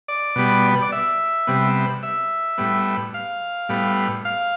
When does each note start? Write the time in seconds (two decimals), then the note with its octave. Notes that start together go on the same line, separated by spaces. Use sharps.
0.08 D5
0.36 B2 G3 B3
0.82 D5
0.92 E5
1.47 C3 G3 B3
2.03 E5
2.58 A2 G3 B3
3.14 F5
3.69 A2 G3 B3
4.25 F5